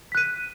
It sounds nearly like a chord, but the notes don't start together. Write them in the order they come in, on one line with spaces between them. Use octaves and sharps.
B6 F#6 D#7